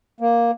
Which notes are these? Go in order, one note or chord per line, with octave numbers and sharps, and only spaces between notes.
A#3